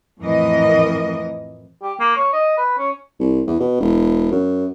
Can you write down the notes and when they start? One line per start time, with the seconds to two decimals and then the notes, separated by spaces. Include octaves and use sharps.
0.20 F2 A2 E3 A#4 D#5
1.83 G4
2.00 A#3
2.16 C#5
2.33 D#5
2.58 B4
2.78 C#4
3.19 C2
3.47 E2
3.60 B2
3.80 E1
4.31 F#2